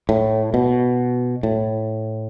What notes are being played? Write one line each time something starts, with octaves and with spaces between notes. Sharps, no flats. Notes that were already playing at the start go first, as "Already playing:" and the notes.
A2
B2
A2